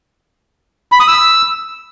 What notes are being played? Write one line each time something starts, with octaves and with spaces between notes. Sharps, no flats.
B5
D#6
E6